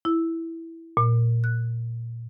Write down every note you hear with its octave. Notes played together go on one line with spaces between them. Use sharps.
E4
A#2
F#6